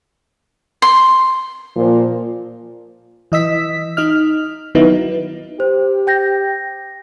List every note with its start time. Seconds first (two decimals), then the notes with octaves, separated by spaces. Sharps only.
0.82 C6
1.76 A#2 F3
3.32 E3 D#5 E6 B6
3.97 D#4 D#5 F6
4.75 D#3 F#3 B3 D#4 E4
5.60 G4 C5
6.07 G5 G6 A#6